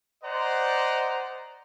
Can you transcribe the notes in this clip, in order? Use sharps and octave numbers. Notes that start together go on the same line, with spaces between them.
C5 D5 D#5 F#5 A#5 C6